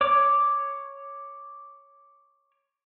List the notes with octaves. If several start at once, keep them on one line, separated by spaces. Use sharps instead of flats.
C#5 D6